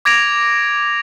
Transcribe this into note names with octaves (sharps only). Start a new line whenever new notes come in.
D6 G#6 A#6 D7 F7